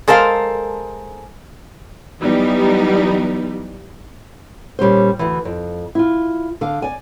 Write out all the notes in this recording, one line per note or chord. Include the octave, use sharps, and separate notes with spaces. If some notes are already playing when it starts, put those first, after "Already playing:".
G#3 A4 A#4 C5 F5
E3 F#3 G3 B3 D#4
A#2 G3 C#4 C5
D2 E3
F2
E4 F4
D3 F5
D5 G#5